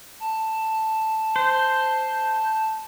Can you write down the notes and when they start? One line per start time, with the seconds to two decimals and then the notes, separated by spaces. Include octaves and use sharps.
0.20 A5
1.36 C5